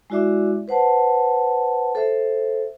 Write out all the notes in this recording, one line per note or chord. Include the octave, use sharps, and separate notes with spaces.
G#3 E4 F#4 D5 E5 D6
B4 C5 F#5 A5
A4 C5 E5